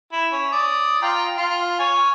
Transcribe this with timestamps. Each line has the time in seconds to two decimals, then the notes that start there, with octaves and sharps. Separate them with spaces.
0.12 E4
0.32 C#4
0.52 D5 D#6
1.02 F4 G5 A#5
1.38 F4
1.79 C#5 G#5